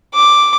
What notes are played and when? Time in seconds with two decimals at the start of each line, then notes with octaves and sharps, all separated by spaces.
0.14 D6